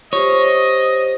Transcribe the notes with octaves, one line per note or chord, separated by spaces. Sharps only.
F4 G4 C5 C#5 D#5